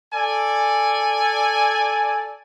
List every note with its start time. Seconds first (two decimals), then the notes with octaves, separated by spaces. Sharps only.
0.13 A4 D5 G#5